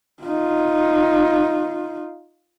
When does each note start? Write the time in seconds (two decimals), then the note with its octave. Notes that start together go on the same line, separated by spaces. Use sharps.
0.23 D#4 F4